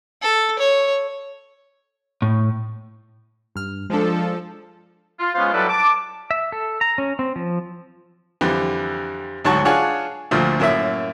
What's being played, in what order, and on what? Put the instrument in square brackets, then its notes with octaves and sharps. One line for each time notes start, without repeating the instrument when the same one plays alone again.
[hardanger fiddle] A4
C#5
[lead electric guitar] A2
[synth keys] G2 F6
[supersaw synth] F3 A4 [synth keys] G#3 D4
[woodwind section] F4
G#3 B3 C#4 F4 C5 F5
F#3 G3 E4 A4 B4 D5
A5 D6
[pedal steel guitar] E5
A4
A#5
C#4
C4
F3
[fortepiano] F2 D3 E3 G3
D2 G#2 F#3 F#4 A5 C#6
D4 F4 G#4 C#5 F#5 A5
D2 A#2 D3 F3 A3
F#2 A2 A#3 E4 E5